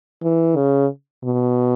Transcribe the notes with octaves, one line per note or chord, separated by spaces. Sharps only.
E3
C#3
B2